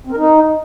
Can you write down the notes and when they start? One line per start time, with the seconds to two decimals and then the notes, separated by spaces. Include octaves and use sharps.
0.07 C4
0.12 A#4
0.17 D#4